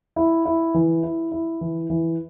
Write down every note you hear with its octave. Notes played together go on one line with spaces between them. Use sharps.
E4
E4
E3
E4
E4
E3
E3